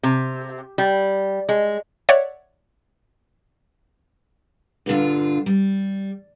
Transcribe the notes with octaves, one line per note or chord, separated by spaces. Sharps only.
C3
G3
G#3
C#5 D5 E5 F#5
G2 A#2 D3 F4
G3